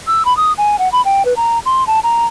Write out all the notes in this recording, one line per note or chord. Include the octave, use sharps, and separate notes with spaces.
E6
B5
D#6
G#5
F#5
B5
G5
B4
A#5
C6
A5
A#5